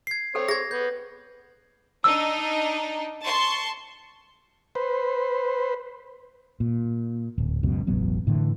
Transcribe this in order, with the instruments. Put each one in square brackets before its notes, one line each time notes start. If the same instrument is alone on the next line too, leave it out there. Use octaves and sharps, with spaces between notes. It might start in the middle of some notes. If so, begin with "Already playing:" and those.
[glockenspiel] G#6 C7
[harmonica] C4 C#5 [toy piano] A4 G5
[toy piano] G#4 [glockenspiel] G#6 A#6
[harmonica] B3 [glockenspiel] G6
[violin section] D4 D#4 [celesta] E6
[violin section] A5 C6 C#6
[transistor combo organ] B4 C5
[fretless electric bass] A#2
D1
C#2 F#2 B2
E1 A1 F#3 B3
A2 D3 E3